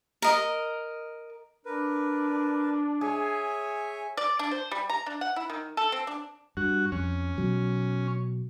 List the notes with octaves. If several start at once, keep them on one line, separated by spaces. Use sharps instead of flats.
A#4 D#5
D4 A#4 B4
G#4 C#5 E5 G#5
D5
D4
C5
G3
A#5
D4
F#5
E4
D#3
A4
C4
D4
G2 F#4
F2 C#4
B2 F#3